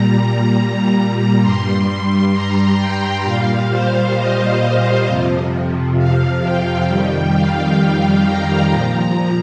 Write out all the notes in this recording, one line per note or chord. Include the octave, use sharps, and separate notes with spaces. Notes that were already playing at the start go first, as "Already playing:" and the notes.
Already playing: A#2 G3 A#5
A#5
G2 G3 C6
A#5
G5
A#2 G3 F5
C5
D#5
D#5
F2 C3 F3
F5
G5
F2 D#3 G3 G5
F5
A#5
A#2 F3 A#5